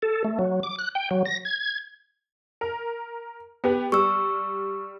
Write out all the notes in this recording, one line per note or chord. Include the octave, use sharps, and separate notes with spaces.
A4
A3
F#3
D6
F#6
G5
F#3
A#6
G#6
A#4
B3 G4 B4
G3 C#6 E6